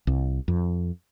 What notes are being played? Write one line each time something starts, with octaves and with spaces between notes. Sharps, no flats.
C2
F2